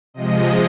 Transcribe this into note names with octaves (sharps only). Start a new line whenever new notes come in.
C3 F3 G#3 D#5